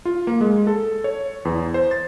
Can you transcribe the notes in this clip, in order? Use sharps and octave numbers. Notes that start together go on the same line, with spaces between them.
F4
A#3
G#3
A4
C#5
E2
C5
A6